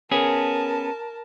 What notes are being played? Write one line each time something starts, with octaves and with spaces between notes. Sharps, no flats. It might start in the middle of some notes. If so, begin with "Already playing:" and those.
B3 C#4 G#4 A#4 A5